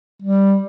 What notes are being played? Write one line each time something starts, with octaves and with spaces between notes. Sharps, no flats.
G3